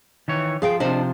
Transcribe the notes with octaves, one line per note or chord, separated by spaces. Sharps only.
D#3 E3 C#5
F3 G#4 F5 G5
C3 F3 D4 C5 D#5